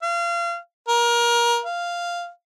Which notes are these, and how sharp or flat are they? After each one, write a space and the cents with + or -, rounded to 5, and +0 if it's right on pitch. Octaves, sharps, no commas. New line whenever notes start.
F5 -30
A#4 +25
F5 -5